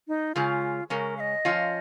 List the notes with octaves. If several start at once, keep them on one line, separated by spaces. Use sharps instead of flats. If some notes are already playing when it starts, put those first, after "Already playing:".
D#4
C#3 G#3 C#4 F4
C#3 G#3 C#4 A#4
F5
D#5
F3 C#4 F4